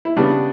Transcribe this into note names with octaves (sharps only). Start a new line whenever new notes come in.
E4
C#3 G3 B3 D4